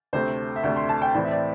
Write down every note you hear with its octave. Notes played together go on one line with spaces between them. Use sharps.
D2 C3 A3 C5
E5
D2 C3 A3 D5
C6
A5
G5
A2 E3 C4 D5
E5
D5